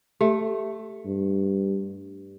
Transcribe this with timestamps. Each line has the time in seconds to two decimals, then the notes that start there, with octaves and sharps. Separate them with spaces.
0.21 A3 G4
1.06 G2